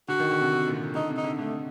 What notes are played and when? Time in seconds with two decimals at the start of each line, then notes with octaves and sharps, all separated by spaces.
0.08 D3 F#4
0.20 D#3
0.31 D3
0.41 C3
0.52 C3
0.67 A#2
0.73 C3
0.95 D3 D#4
1.10 C3
1.17 D#4
1.24 D3
1.38 D3 A3